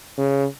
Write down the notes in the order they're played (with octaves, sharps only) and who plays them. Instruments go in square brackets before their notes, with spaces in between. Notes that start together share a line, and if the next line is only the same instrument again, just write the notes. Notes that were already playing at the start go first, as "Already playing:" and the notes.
[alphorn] C#3